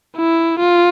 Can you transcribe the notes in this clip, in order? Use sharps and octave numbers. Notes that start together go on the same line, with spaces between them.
E4
F4